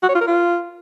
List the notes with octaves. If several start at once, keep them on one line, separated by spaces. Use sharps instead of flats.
F#4
C#5
F4
A#4
F4